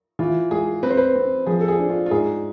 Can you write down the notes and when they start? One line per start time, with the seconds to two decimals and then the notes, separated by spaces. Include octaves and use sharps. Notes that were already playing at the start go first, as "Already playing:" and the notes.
0.19 E3 F4
0.51 G#3 G#4
0.83 C4 B4
0.90 C5
0.97 B4
1.16 C4
1.46 F3 G#4
1.61 A4
1.68 G#4
1.79 D4
1.90 F4
2.06 F4
2.11 G#2 G#4